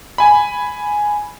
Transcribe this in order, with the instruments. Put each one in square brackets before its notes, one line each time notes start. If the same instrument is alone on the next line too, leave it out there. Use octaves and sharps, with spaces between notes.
[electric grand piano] G#5 B5